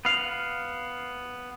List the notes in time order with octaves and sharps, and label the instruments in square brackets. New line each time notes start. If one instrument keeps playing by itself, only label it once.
[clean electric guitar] B3 F5